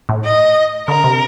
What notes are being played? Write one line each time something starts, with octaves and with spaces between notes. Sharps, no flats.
A2
D#5
D3 A#4
C3